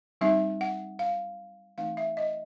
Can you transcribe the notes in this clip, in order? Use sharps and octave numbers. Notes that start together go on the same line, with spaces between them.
G3 C4 D#4 E5
F#5
F5
E3 A3 C4 D#4 F5
E5
D#5